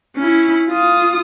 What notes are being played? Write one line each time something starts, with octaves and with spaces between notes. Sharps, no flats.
C#4 E4
F4 D#6